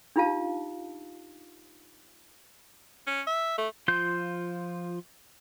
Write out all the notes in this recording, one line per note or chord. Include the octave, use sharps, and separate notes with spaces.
D4 D#4 F4 G4 F5 A5
C#4
E5
A3
F3 F4 C6 G6